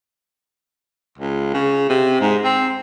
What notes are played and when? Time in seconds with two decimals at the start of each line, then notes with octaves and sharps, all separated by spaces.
1.18 C#2
1.54 C#3
1.89 C3
2.21 G#2
2.44 C4